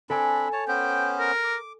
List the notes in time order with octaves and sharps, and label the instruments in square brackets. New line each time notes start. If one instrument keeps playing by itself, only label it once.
[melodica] C4 D4 B5 [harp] A4 G#5 D7
[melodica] C#5 A5
[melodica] B3 C#4 C5 [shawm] G5
[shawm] A#4
[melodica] D6